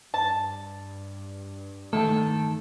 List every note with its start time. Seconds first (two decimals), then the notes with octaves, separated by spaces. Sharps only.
0.14 G2 A5
1.93 D#3 A3 A4